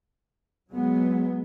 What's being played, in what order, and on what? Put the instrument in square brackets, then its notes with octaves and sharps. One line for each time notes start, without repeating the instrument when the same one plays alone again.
[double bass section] F#3 G#3 B3